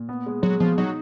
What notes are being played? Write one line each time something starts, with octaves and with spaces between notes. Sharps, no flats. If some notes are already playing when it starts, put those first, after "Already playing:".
Already playing: A#2
B3
G#3
F#3 G#3
B2 F3
F#3 D#4